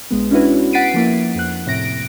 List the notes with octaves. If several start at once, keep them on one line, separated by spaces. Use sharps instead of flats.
A#1 G#3 B3
C#4 D4 E4 F#4 B4
F#5 A6 B6 C7 D7 D#7
F3 A#3 E4
F2 F#6
A2 C3 A#6 D7